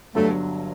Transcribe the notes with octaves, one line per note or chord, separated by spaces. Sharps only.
G1 G2 D3 F#3 A3